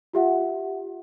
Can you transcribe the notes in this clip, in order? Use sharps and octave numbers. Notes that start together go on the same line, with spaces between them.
F4 G4 E5 F#5